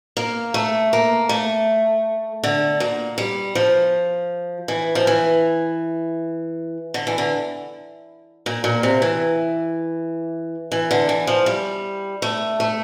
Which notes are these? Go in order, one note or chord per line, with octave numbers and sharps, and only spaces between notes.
A#3
A3
A#3
A3
D3
A#2
G3
F3
E3
F3
E3
D3
E3
D3
A#2
A#2
C3
E3
E3
D3
E3
F3
G3
A3
A3